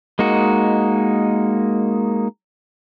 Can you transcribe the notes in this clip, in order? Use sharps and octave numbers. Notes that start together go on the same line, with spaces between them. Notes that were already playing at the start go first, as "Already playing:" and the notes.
G#3 A#3 D#4 F#4